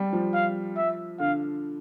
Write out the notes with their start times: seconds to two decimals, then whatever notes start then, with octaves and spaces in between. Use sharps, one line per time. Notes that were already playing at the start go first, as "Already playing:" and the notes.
Already playing: G3
0.13 F3
0.34 F5
0.76 E5
1.20 D3 F5